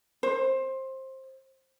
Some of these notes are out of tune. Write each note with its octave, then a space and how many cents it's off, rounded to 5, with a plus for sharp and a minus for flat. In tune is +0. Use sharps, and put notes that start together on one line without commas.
C5 +15